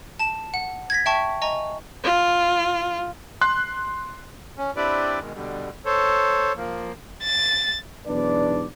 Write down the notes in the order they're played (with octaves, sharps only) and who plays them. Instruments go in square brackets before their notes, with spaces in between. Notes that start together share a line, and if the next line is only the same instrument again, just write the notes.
[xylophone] A5 E7
F#5
G#6 A#6 B6
E5 G5 A5 C#6
D#5 G#5 A#5 C#6
[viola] F4
[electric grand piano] C6 F#6
[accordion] C#4
C4 D4 E4 G4 B4 D5
B2 D#3 G#3
B2 D3 G3
A4 C5 C#5
F3 A#3
[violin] A6
[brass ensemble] B1 E2 G#2 D4 B4 D5